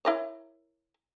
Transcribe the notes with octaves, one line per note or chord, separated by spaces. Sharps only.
E4 A#4 C#5